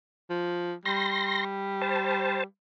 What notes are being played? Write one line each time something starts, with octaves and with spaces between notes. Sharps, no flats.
F3
G3 C6 A#6
C5 A5